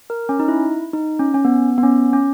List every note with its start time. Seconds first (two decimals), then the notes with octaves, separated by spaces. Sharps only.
0.10 A#4
0.29 C#4
0.40 D#4
0.48 E4
0.93 D#4
1.19 C#4
1.34 C#4
1.45 B3
1.78 B3
1.83 C#4
2.13 C#4